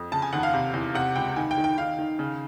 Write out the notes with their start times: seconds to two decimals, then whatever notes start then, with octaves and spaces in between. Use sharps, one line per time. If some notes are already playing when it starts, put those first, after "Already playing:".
Already playing: F2
0.12 C#3 A5
0.22 G#5
0.33 D#2 F#5
0.43 F5
0.54 C3
0.74 E2
0.94 C3 F#5
1.16 C#2 G5
1.36 D#3 G#5
1.51 G5
1.58 D#3
1.64 G5
1.78 D#3 F5
1.98 D#3
2.19 C#3